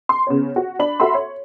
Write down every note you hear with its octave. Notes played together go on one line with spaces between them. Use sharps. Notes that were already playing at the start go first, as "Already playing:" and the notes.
C6
C#3 B3 C#5
F#4
D4 B5 F#7
F#4 A4 E5 B5 C6
C#5